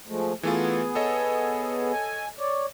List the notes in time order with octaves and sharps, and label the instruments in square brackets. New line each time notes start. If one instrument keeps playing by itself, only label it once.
[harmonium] F3 G#3 A3
[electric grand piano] E3 A3 F4 [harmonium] B3 G#4
[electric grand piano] A4 C#5 D#5
[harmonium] G#5
C#5 D5